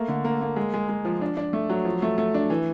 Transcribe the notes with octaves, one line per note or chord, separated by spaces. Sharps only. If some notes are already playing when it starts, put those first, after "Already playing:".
Already playing: A3 A#3
D3
A#3
A#3
G#3
G#3
G#3
F3
D4
D4
A3
F#3
F3
A3
A3
D4
E3